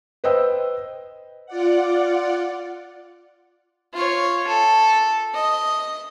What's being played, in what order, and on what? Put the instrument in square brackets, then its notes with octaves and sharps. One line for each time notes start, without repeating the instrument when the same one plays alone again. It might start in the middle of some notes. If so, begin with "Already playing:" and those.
[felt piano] B4 C5 D#5 G5 E6
[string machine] F4 D5 F#5
[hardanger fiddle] F4 C#5
A4
D#5